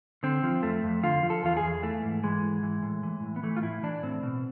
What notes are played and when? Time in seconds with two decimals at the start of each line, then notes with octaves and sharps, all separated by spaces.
0.23 D3 C4
0.43 F3
0.63 F2 A3
0.84 F2
1.03 D3 F4
1.23 F3
1.30 A4
1.43 E2 F4
1.57 G#4
1.64 E2
1.83 E3 A3
2.03 G#2
2.23 E3 G#3
2.43 G#2
2.63 E3
2.83 A2
3.03 E3
3.24 A2
3.36 B3
3.43 E3 A3
3.57 F4
3.63 A2 E4
3.83 E3 D4
4.03 A2 C4
4.23 B2